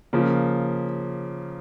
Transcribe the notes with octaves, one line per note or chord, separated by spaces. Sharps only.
C#3 F3 A#3